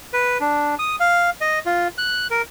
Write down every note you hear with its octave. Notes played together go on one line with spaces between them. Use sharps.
B4
D4
D#6
F5
D#5
F4
F#6
A#4